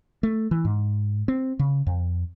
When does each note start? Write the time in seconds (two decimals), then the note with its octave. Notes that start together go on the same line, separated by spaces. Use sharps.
0.23 A3
0.51 E3
0.65 G#2
1.28 C4
1.59 C#3
1.87 F2